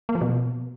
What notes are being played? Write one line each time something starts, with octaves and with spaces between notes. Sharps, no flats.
A#3
F3
B2